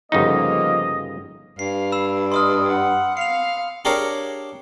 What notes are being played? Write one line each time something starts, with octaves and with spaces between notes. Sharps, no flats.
G1 C#3 F3 A#3 D#4 F4 D#5
G2 F5 C7
B5 E6 E7
D#5 C6 D#6 F6
F#5
F5 C#7 F7
D4 G4 G#4 A#4 C#5 F5